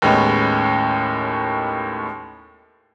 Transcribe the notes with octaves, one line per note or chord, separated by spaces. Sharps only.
D#2 A2 G#3 B3 C#4